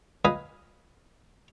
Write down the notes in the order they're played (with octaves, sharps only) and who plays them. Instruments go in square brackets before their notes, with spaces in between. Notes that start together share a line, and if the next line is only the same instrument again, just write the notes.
[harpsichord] B4 D#5 F5 G#5